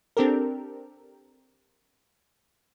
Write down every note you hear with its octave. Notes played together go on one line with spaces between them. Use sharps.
C4 D4 G4 A4 A#4